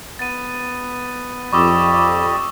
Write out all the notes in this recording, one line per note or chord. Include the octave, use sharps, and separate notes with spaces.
B3 A6 D#7
F2 G4 D5 D#5 B5 C#6 D6 E6